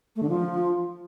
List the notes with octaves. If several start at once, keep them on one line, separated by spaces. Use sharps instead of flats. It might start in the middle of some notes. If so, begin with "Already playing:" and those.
A3
D3
F3